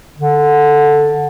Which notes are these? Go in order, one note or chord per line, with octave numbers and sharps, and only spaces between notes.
D3